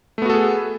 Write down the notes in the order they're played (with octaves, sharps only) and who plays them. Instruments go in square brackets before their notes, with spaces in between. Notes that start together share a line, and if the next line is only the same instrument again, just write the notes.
[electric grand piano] A3
B3
F#4
A4
G#4